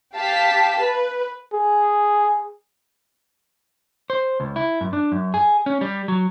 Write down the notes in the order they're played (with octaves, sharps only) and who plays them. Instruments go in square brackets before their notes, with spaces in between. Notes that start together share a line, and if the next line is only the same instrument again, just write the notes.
[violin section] G4 F5 A5 B6
B4
[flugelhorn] G#4
[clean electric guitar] C5
C#2
E4
F#2
D4
F#2
G#4
C#4
G3
F#3